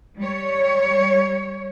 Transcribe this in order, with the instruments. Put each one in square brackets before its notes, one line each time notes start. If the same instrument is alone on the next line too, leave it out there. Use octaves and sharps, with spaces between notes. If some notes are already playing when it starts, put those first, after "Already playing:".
[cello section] G3 C#5